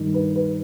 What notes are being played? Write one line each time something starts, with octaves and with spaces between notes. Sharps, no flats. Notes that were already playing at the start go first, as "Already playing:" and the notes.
Already playing: G2 D#3
B4
B4